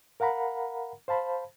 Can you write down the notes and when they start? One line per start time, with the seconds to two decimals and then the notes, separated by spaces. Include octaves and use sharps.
0.20 A#4 F5 F#5 A#5 B5
1.08 C5 F5 A5 B5